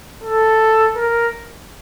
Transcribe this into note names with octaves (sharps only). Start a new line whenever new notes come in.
A4
A#4